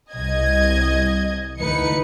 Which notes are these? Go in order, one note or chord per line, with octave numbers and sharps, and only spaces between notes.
C2 D#5 G#6
D2 E3 D#4 B4 C#7